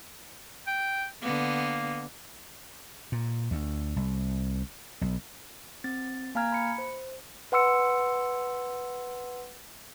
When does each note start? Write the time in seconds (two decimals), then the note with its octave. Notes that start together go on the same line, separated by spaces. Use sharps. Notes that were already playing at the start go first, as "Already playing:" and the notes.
0.67 G5
1.21 D3 A#3 B3
3.12 A#2
3.51 D2
3.96 C2
5.01 B1
5.84 C4 A6
6.35 A#3 F5 G#5 A#5 F6 G#6
6.52 B5 C#7
6.78 C5
7.52 B4 F#5 C6 E6 C#7